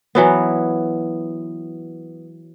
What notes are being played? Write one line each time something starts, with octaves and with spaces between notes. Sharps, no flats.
E3 F#3 B3